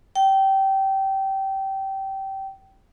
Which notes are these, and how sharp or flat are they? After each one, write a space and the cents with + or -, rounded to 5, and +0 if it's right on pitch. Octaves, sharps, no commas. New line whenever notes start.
G5 -20